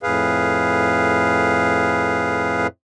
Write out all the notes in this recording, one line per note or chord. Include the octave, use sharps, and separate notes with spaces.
F2 A2 G#4 B4 F5